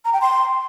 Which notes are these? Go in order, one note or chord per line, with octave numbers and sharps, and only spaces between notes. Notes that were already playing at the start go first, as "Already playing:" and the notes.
A#5
G5
C6